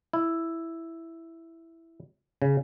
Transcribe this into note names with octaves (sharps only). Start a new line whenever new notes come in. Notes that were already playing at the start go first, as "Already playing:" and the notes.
E4
C#3